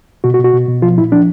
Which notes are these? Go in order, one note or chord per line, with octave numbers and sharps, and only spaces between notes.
B2 F#4
F#4
B2
F#4
B2
B2
F3 F4
A#2 E4
F3 D4